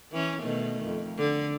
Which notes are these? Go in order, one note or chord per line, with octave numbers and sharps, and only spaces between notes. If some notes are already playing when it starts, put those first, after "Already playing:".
E3 C#4
B2 D#3 A3
F2
D3